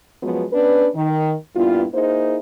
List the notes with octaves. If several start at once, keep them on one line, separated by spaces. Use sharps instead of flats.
F#2 F3 F#3 G#3 B3
B3 C#4 D4 B4
D#3
G2 A#2 B3 E4 F4
A#3 D#4 E4 G#4 C5